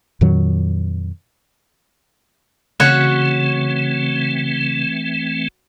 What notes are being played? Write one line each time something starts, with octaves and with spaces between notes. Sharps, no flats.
F2 A#2 D#3 F#3
C#3 E3 A3 C4 F#4 C#5